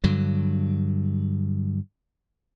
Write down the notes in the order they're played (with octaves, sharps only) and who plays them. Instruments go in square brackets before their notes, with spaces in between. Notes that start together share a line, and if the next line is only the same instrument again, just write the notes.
[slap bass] G2 D3 F#3